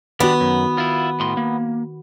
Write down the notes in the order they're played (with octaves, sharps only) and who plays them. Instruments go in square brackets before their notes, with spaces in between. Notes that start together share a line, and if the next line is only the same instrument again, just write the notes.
[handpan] D#3 F#4 [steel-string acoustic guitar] B3 [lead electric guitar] D4 G4
[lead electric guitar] F#2
E4 F4
A2 C6
A#3